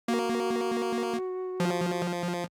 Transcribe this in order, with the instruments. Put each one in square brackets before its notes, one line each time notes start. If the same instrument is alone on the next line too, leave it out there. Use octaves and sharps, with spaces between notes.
[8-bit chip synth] A#3 [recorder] F#4
[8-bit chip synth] F3